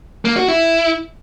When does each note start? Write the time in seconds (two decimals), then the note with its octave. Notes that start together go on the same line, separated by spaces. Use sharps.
0.25 A#3
0.37 F#4
0.48 E4